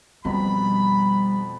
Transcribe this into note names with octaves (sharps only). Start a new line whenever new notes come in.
F2 B2 G3 A#5 B5